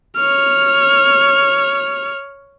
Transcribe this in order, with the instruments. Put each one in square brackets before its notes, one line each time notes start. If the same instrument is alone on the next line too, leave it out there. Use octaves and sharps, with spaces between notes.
[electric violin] C#5 F6